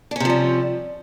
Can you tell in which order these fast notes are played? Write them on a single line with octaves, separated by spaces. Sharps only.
D4 C#4 C3 F3 G3